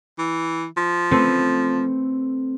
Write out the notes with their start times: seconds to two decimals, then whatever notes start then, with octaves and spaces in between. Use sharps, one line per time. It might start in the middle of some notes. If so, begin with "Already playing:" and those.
0.18 E3
0.77 F3
1.11 A3 C4 B4